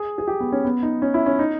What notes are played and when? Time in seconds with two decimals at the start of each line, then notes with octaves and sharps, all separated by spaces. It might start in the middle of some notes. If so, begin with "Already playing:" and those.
Already playing: G#4
0.18 G#4
0.27 G4
0.40 B3
0.52 C#4
0.65 B3
0.83 D#4
1.02 C#4
1.14 E4
1.26 C#4
1.39 D#4